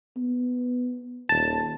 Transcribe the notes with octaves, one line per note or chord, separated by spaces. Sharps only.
B3
D#1 A5